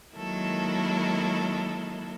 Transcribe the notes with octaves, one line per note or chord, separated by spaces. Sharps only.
D#3 F#3 G#3 A#3 E4 A4